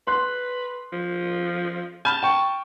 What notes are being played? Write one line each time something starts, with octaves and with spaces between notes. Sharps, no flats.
B4 C6 F#6
F3
A5 B5 F6 G6
G5 C#6